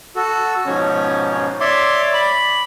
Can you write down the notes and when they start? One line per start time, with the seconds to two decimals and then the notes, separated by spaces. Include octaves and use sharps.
0.16 F#4 A4
0.66 G#2 B2 F3 C#4
1.60 C#5 D5 E5 C6 D6
2.13 B5